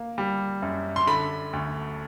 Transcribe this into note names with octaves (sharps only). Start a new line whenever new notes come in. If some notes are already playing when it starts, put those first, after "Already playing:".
Already playing: A#3
G3
F#2
C6
D3 B5
D2